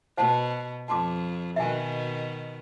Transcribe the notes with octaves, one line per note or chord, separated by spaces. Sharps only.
B2 C5 F#5 A5
F2 A5 C6 D6
B2 D#3 E5 G#5